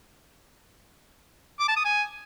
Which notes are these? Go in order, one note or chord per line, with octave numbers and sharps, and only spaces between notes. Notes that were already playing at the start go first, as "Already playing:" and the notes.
D6
A5
D#6
G#5